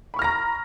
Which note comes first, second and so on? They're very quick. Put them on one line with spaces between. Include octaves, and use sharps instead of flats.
B5 C#6 F6 A#6 A#5